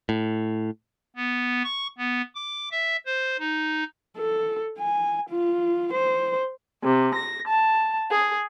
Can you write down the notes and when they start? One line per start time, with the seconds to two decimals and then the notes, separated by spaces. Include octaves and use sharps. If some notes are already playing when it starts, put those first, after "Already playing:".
0.09 A2
1.16 B3
1.64 C#6
1.98 B3
2.35 D6
2.71 E5
3.06 C5
3.39 D#4
4.18 A4
4.79 G#5
5.29 F4
5.93 C5
6.84 C3
7.15 A#6
7.48 A5
8.11 G#4